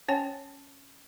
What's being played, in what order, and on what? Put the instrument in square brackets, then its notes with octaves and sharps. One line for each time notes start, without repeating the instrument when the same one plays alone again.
[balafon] C#4 C#5 G5 G#5